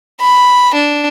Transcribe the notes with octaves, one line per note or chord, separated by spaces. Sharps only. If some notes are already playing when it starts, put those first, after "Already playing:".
B5
D4